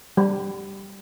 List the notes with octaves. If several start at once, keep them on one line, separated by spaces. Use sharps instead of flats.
G3